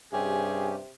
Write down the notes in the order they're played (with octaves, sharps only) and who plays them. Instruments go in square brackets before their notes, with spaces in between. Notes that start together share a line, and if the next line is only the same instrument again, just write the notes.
[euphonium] G2 [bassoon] C3 [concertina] C#4 G4 [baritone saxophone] G#4